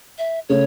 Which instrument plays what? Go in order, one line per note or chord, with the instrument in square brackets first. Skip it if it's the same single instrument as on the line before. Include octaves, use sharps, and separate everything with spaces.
[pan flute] E5
[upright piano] C#3 A3 [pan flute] C#5